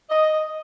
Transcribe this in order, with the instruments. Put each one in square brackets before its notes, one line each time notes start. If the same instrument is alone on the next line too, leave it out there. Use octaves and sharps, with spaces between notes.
[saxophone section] D#5